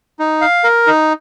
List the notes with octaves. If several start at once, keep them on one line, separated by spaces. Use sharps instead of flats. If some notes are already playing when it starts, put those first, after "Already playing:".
D#4
F5
A#4
D#4